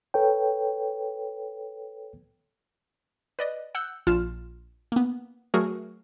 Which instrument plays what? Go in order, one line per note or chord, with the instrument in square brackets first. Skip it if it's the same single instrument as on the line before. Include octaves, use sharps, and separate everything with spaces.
[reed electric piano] A4 B4 C#5 G5
[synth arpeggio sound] B4 D5 D#5
F#5 E6 F#6 G6
A#1 F4 F6 E7
A#3 B3
F#3 A3 F#4 G#4 A#4